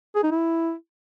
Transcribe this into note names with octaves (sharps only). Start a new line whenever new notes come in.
G#4
D#4
E4